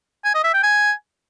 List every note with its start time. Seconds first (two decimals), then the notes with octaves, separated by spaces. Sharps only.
0.25 G#5
0.34 D#5
0.44 E5
0.53 G5
0.63 G#5